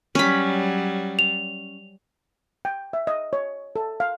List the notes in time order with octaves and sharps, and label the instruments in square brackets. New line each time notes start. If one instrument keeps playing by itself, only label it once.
[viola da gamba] F#3 G3 [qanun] C#4 B5
[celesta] F7
[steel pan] G5
E5
D#5
C#5
A4
F5